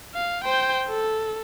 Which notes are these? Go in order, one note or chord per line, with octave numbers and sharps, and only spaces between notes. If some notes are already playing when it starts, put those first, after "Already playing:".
F5
C5 G5
A4